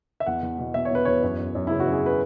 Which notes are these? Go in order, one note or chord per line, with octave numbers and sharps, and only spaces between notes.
E5
E2 F#5
E2
B2
B2 E5
C#5
B2 B4
E2 C#5
F#2
F#2
F#2
C#3 E4
F#4
F#2
G#4
B4